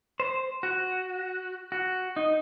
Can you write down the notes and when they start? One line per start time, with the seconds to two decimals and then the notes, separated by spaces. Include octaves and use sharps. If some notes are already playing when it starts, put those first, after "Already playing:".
0.20 C5
0.63 F#4
1.72 F#4
2.16 D#4